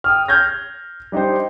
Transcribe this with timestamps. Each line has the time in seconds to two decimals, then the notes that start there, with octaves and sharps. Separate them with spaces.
0.04 G5 D#6 F6
0.28 F6 G6 G#6 A#6
1.12 G3 D4 D#4 G4 C5